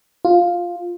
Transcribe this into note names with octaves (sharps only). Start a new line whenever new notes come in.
F4